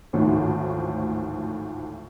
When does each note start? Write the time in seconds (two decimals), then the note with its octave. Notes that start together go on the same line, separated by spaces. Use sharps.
0.13 G#1 D2 A2 D#3 F3 C#5